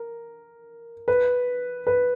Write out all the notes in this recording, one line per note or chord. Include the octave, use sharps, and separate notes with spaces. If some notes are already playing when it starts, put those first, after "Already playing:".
Already playing: A#4
B4
B4